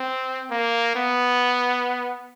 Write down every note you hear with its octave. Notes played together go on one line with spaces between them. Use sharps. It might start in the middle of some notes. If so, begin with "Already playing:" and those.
Already playing: C4
A#3
B3